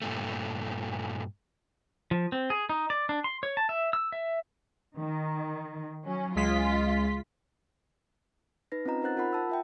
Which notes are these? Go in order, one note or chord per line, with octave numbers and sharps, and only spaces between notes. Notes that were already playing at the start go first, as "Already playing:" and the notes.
G2 A#2 A3
F3
C4
G#4
D#4
D5
D4
C6
C#5
A5
E5
E6
E5
D#3
F#3 C#4
C#2 G#3 F4 B6
D#4 B4 A#6
C4 C#4 F4 D#5 A#5
D#4 A#4 C5 F#5 F#6 A6
F4 A#4 F#5 B5
F#5 A5 E6
F4 E5 G5